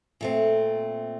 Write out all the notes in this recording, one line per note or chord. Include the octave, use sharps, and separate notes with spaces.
A#2 A3 C4